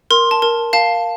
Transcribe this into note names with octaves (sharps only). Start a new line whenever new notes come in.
A#4 C6
A5
A#4
F5 A5